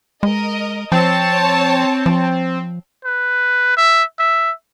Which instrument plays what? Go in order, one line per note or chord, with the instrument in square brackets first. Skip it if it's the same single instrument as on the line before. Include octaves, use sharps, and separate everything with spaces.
[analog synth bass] G#3 [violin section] A#4 D#5
[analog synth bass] F3 [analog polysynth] C4 [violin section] C#5 A5
[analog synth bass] F3
[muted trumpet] B4
E5
E5